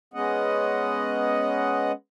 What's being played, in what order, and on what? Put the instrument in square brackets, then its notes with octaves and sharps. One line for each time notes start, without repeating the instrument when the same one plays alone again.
[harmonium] G#3 B3 C#4 D#5 F#5